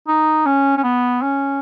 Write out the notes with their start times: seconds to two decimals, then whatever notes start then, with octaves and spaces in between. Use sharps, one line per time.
0.07 D#4
0.46 C#4
0.77 C#4
0.83 B3
1.22 C#4